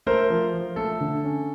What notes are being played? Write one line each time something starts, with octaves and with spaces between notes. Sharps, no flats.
A3 A#4 C5
F3
F3
A3 A4
D3
C#4